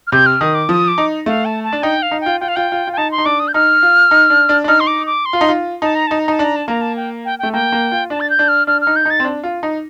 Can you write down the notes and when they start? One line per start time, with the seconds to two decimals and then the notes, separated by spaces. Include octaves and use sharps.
0.07 F6
0.12 C3 G6
0.26 F6
0.41 D#3 D#6
0.55 D6
0.69 F3 D#6
0.88 D6
0.98 D#4
1.26 A3 F5
1.45 A5
1.64 A5
1.72 D4
1.83 D#4 G5
2.02 F5
2.11 D#4
2.21 G5
2.26 F4
2.40 F4 G5
2.48 F5
2.56 F4 G5
2.72 F4
2.87 F4
2.93 G5
2.97 D#4 A5
3.12 C6
3.18 D#4
3.25 D4 D6
3.40 D#6
3.48 G6
3.54 D#4 F6
3.83 F4
4.11 D#4
4.30 D4
4.49 D4
4.64 D4
4.68 D#4 F6
4.80 C6
4.87 D6
5.07 D6
5.26 C6
5.33 F4
5.41 D#4
5.48 F4
5.82 D#4 A5
5.95 A#5
6.07 D#4 A5
6.20 A#5
6.28 D#4 A5
6.39 D4 A#5
6.56 A5
6.68 A#3 A#5
6.81 A5
6.97 G5
7.25 G5
7.39 A3 G5
7.53 A#3 G5
7.72 A#3
7.92 F4
8.10 D4 A5
8.20 A6
8.30 G6
8.39 D4
8.48 F6
8.67 D4 F6
8.81 F6
8.87 D#4
8.96 G6
9.05 D#4 A6
9.20 C4
9.24 D4
9.44 F4
9.63 D#4